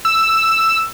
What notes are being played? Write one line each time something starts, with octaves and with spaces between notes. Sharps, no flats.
E6